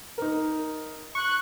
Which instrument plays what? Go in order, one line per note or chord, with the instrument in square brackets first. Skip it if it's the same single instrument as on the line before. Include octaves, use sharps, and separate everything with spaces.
[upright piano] D#4 A#4
[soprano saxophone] C#6 [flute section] F#6